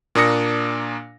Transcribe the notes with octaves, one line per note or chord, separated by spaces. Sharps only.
A#2 A#3 D4 D#6 A#6 C#7